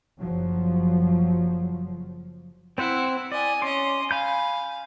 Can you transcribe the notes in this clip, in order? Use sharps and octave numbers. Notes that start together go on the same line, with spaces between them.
F#1 F3 F#3
C4 E4 C5 F#5
D5 D#5 G#5
C#4 D#5 C6 D6
F5 G#5 B5 G6